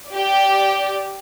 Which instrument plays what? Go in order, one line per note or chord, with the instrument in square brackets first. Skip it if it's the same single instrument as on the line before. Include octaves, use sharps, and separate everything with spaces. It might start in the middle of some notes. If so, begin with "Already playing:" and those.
[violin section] G4 D5